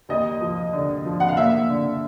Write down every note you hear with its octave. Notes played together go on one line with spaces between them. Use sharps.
D#2 D#5
F3
D3
F3
F#5
F5
A#3 E5
D3